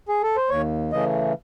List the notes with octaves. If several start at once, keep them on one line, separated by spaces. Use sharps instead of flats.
G#4
A4
C5
D#2 C#5
C#3 E3 A3 D#5